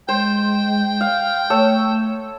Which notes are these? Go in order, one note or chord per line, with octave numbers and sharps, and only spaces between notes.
G#3 C5 G5
F5
A3 A4 C#5 E6